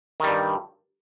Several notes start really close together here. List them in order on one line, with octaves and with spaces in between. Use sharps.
D#3 G3 G2